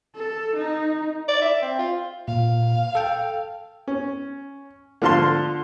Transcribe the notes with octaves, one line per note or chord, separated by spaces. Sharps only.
A4
D#4
D5
E5
C4
F4
A#2 F5
A4 G5
C#4
D3 F3 F5 A5 C6